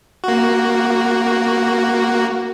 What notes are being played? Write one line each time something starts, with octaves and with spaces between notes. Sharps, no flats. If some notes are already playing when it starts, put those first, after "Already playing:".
A#3 F#4